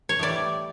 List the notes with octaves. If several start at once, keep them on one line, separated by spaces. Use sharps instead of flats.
C#5
A2 E3 G3 D5